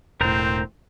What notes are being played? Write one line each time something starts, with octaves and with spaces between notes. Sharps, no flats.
E1 A2 C4 A#4 C5 A#5